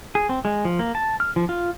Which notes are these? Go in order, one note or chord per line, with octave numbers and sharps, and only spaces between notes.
G#4
C4
G#3
F3
A#3
A5
F6
F3
F4